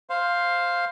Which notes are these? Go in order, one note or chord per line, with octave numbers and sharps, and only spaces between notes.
C5 F5